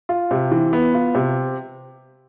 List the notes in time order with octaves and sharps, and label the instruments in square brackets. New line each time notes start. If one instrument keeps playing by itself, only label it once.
[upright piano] F4
C3
E3
B3
F4
C3